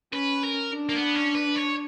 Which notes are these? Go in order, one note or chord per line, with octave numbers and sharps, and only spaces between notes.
C#4 B4
A#4
D4
A#3
B3
C#4
B4
C#5